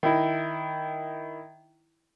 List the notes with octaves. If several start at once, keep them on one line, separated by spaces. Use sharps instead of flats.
D#3 E4